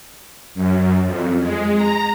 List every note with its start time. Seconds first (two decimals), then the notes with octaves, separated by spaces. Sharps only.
0.54 F#2
1.04 F2
1.41 G#3
1.77 A#5